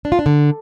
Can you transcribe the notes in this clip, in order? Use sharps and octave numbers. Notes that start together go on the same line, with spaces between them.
D4
F4
D4
D3